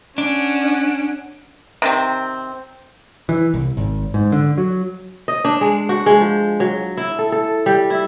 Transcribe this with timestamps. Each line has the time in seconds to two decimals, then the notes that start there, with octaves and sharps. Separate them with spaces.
0.18 C#4 D4 F#5
1.82 C3 D#3 C4
3.29 E3
3.54 C2
3.77 G#1
4.14 G#2
4.32 D3
4.58 F#3
5.28 D#5
5.45 D4
5.61 G#3
5.89 F#4
6.06 G#3
6.21 F3
6.60 F#3
6.97 E4
7.19 A4
7.32 A4
7.66 G3
7.90 E4